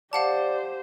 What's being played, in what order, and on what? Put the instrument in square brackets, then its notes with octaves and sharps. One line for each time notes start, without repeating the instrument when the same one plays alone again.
[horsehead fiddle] G4 C5 [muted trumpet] D5 [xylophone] F5 F#5 A5